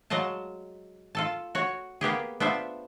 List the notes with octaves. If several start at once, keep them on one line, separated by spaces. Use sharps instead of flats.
F#3 G#3 D#5 F5 A5
F4 A4 A5
F#4 C#5
A#3 B3 G4 G#4
B3 D4 F4 C5 E5